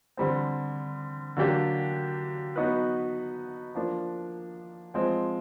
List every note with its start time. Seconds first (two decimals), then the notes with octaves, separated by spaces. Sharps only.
0.17 D3 G3 C4
1.37 D3 F#3 A#3 D4 G4
2.56 F#3 B3 D#4 F#4 B4
3.75 F3 A#3 D4
4.94 F3 G#3 C4